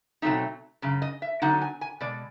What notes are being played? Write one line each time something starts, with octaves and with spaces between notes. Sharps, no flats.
B2 F#3 A3 C4 D#4 E5
F#2 C#3
D#5
E5
D3 F#3 B3 D#4 F#5
G#5
G#5
B2 G#3 D5